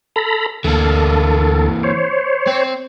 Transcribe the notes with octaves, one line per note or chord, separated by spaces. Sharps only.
A4 A#5 B5
D2 E3 A#3 A4
C5 C#5
C4